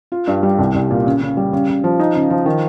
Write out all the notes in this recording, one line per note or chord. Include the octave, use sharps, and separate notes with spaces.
F4
G2
G3
C2
C2
A#2
C#3
C#3
G3
C#3
C#3
F3
D#4
C#3
F3
D#3